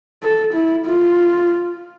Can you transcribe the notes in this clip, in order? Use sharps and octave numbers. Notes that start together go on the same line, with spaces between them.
A4
E4
F4